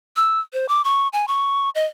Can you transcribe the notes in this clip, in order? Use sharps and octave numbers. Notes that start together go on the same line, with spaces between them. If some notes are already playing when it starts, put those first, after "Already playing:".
E6
C5
D6
C#6
G#5
C#6
D#5